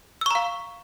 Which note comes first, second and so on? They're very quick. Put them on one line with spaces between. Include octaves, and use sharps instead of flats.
E6 C#6 A#5 F5